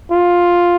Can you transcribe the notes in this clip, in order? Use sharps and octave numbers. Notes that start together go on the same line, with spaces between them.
F4